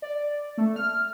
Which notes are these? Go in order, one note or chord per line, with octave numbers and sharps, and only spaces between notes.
D5
A3
F6